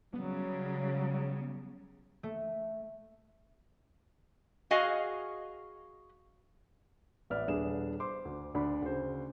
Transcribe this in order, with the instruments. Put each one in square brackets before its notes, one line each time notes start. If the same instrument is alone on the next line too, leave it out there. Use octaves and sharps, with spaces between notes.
[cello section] C#3 G3 [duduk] F#3 [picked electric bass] B3
[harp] A3
[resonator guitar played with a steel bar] F#4 G#4 D#5 F5 G#5
[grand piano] A1 B3 D5 E5 F6
D#1 B3 D4 G#4 E7
C5 C6 D6
D2
D2 D4 B5
D2 C#3 C5